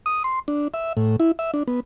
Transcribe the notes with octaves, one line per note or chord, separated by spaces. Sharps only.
D#6
C6
D4
E5
A2
E4
E5
D4
B3